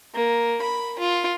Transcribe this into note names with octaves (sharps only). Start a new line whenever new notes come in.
A#3
B5
F4